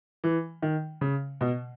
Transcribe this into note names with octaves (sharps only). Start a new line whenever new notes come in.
E3
D#3
C#3
B2